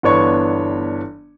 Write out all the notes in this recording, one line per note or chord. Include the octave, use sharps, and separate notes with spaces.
G1 E3 B3 D4 C#5 C#6